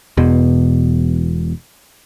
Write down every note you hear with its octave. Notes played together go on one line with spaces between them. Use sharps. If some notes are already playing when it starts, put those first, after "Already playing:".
E1 E2 B2